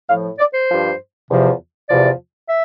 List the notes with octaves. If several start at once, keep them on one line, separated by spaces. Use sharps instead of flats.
A2 F3 F5
D5
C5
G2 F3
E2 C3 F3
E2 C3 F3 D5
E5